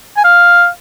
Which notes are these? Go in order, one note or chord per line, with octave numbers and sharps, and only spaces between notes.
G#5
F5